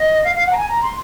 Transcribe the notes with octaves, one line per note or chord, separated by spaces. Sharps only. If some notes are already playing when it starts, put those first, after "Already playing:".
Already playing: D#5
F5
F5
F#5
A#5
G#5
A#5
C6